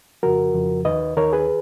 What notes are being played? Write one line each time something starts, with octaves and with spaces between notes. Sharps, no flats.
F2 C#3 F3 F#4 A#4
F2 C#3 F3
D#2 D#3 B4 D#5
D#2 D#3 A#4 C#5
G#4 B4